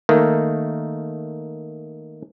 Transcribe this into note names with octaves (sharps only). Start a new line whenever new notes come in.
D#3 A3 A#3